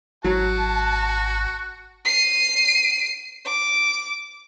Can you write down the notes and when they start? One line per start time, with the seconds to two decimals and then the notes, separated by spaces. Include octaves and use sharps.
0.24 G#1 F#3 F#4 A5
2.05 C7 D#7
3.46 D6